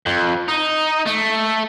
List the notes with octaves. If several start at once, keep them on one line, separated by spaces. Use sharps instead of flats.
F2
D#4
A3